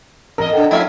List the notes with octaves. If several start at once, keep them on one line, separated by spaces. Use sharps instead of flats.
E2 A#4 D#5
A#2 D4 A4 F#5 G5
F3 A3 C#4 E4 E5 F5